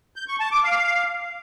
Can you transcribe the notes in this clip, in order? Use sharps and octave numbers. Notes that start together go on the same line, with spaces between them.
G6
C#6
A5
D6
F5